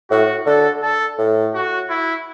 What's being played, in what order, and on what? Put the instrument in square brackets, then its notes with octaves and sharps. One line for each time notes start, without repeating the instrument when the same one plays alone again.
[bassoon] A2 [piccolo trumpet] F#4
[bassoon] D3 [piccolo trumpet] A4
[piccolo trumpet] A4
[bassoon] A2
[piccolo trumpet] F#4
E4